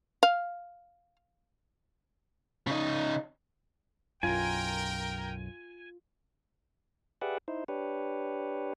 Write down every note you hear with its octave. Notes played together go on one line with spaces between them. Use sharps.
F5
C#3 D#4
B1 F#2 F4 A#4 G5 G#5
G4 G#4 B4 D5 E5 F#5
D#4 E4 C5
D4 G4 B4 C#5